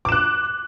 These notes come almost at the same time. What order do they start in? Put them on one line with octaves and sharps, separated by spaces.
D6 E7 F#6